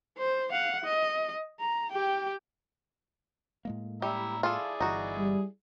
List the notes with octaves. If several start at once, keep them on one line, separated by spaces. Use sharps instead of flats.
C5
F5 F#5
D#5
A#5
G4 G5
A2 G#3 A#3
G3 E4 E5 A#5
E4 F4 G#4 A4 D5
G1 G2 E3 D#4 F#4
G3